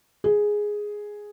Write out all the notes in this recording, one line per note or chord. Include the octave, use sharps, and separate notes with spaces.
G#4